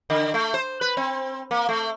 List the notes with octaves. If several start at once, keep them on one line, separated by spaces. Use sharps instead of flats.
D3
A3
C5
B4
C4
A#3
A3